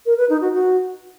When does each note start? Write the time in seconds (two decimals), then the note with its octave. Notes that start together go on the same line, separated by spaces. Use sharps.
0.06 A#4
0.18 B4
0.30 D#4
0.41 F#4
0.53 F#4